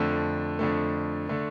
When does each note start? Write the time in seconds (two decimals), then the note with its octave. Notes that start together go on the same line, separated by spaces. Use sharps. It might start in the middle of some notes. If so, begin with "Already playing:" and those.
Already playing: F2 D3 A3
0.59 F2 D3 A3
1.29 D3 A3